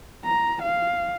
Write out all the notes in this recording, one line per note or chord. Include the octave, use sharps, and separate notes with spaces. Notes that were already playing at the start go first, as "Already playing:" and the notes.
A#5
F5